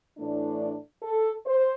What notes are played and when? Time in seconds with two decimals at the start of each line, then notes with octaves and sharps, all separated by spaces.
0.17 A2 E3 A3 D4
1.03 A4
1.46 C5